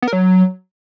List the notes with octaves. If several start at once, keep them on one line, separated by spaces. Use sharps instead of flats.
B3
A#4
F#3